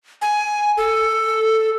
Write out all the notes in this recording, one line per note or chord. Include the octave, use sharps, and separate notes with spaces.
G#5
A4